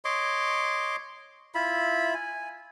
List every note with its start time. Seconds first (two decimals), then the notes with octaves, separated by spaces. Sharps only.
0.05 C#5 D#5 C6 D6
1.55 E4 F4 E5 B5
2.14 G#5